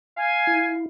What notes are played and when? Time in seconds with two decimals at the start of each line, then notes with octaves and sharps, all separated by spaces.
0.17 F5 G#5
0.47 E4